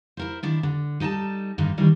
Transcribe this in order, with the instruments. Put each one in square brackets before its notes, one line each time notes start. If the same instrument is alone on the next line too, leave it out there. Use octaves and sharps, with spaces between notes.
[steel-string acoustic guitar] E4 A#4 C5
D#3 D4 E4
D3
G3 D#4 A4 G5 A5
G2 D3 D#3 D#4
D#3 E3 G3 D4 A#4 C#5